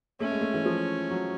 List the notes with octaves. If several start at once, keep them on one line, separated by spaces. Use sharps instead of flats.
A3 C#4
G#3
A3
E3
F3
F#3